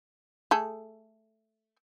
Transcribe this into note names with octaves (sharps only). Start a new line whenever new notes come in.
A3 G#4 A4